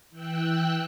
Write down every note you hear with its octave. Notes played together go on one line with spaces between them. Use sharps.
E3 G5 E6 F#6